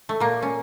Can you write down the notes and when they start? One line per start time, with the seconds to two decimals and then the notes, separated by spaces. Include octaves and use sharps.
0.09 A3
0.20 A#2 A#3
0.42 C#4